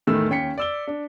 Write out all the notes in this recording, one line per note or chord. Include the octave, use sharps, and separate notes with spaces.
E2 A2 D#3 A3 E6
D#2 C#4 G5 B6 C#7
D5 E6 G7
D4